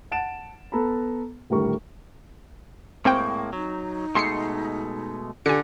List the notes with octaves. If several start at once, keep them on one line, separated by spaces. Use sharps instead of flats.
F#5 A5 A6 D7 E7
B3 A4 A#5 B5
D#1 A2 D3 G3 A#4 C#6
A2 G#3 A#3 C4 G5 C#6
F#3 D#4
B2 G#3 A3 C6 C7 C#7
D3 G4 G#5 C#7